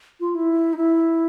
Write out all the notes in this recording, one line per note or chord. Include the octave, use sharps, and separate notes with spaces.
F4
E4
D#4
E4